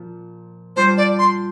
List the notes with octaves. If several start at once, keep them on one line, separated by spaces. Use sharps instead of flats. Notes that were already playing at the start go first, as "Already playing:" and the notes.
Already playing: A#2 F3
G3 D4 F4 C5
D5
C6